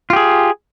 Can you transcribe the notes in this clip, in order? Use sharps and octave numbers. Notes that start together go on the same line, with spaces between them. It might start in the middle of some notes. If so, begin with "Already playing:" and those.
F4 G4 G#4